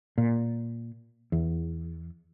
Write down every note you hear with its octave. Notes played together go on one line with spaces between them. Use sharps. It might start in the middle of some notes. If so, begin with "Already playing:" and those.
A#2
E2